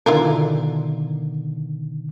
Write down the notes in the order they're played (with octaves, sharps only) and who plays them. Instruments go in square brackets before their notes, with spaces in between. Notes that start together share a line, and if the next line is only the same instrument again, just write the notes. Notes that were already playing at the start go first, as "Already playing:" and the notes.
[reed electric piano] B2 D3 D#3 [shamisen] E4 F4 A#4